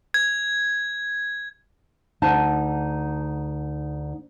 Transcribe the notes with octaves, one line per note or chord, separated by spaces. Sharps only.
G#6
D2 D#4 F#5 A5